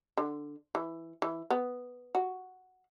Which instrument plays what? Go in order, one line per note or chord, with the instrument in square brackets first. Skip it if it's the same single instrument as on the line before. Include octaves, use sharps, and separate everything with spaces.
[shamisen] D3
E3
E3
B3
F#4